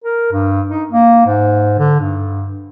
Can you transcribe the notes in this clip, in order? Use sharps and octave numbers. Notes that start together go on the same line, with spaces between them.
A#4
G2
D#4
A#3
G#2
D3
G2